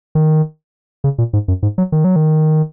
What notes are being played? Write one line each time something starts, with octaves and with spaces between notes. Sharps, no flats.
D#3
C#3
A#2
G#2
F#2
G#2
F#3
D#3
F#3
D#3